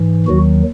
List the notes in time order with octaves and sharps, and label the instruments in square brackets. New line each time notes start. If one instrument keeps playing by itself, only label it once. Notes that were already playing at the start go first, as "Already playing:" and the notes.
Already playing: [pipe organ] G#2 E3
D#2 D#3 F#3 F#4